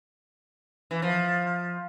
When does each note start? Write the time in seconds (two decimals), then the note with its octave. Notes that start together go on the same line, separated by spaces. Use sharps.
0.91 E3
1.02 F3